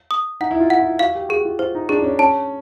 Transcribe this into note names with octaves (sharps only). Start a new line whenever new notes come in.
D#6
D#4 F#5
E4
F4
F#5
F4
F#4 F5
G4
F#4 G#4
F4
F4 C5
D#4
D4 G#4
D4
C#4
C#4 A5